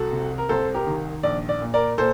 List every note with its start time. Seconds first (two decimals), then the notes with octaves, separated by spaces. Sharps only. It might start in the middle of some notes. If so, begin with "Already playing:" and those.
Already playing: C2 F#4 A4
0.12 C3
0.38 A#4
0.49 C2 A4 C5
0.74 G4 A#4
0.87 D#3
1.23 A#1 D5
1.49 D5
1.61 A#2
1.74 A#4 D5
1.98 A#2 A4 C5